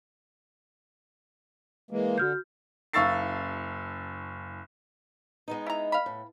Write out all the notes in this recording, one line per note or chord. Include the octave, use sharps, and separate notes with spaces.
E3 G#3 A#3
D3 F#4 F6 G6
F#1 F5 C#6 E6 A6 C7
G#3 B3 D#4
E4 A#5
F5 B5
A2